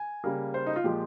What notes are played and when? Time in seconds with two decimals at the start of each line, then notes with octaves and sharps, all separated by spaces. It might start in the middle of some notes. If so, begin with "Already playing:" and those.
Already playing: G#5
0.24 C#3 G3 A#3
0.54 C5
0.66 D#4
0.76 F4
0.84 A#2 F3 G#3 G4